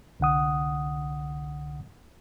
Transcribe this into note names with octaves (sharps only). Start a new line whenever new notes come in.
C2 D3 F#5 D#6